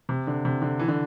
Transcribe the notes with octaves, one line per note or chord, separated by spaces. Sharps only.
C3
D3
C3
D3
E3
D3